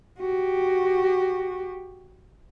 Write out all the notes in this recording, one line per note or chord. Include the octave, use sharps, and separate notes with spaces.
F#4 G4